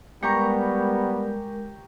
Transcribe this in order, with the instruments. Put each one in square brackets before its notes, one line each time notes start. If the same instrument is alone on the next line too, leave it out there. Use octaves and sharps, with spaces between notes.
[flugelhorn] G3 [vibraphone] G#3 A#4 [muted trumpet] B3 [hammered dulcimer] G4 A#5 C#6